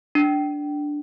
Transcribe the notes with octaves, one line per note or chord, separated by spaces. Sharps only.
D4